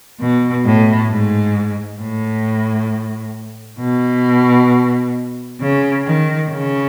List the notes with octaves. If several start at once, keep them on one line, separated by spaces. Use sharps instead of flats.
B2
A2
G#2
A2
B2
C#3
D#3
C#3